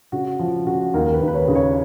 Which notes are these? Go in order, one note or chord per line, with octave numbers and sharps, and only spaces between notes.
C#3 F#4
F3
C#3 F#4
D#2 A#4
A#4
B4
D#2
B4
C#5
C#3
C#5